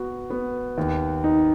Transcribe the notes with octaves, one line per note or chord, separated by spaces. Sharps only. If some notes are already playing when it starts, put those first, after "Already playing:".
Already playing: B3 F#4
B3
D#2
D#4